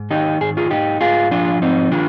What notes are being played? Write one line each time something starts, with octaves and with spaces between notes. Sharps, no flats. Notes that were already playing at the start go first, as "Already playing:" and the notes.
Already playing: G#2
D#3 D#4 G4
G#2 G#4
F4 G#4
G#2 D#4 G4
G#2 F4 G#4
F3 D4 F4
G#2 C4 D#4
D#3 D4 F4